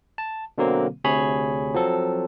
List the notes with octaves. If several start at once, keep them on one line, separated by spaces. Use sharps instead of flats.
A5
B2 D3 F#3 A#3 C4
D2 C3 G#4 C#5 G#5 B5
F3 F#3 C4 A4